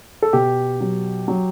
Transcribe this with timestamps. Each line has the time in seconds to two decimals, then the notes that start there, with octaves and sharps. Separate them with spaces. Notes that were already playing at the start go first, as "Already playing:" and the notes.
0.22 A4
0.33 B2 G4
0.81 F#3
1.28 F#3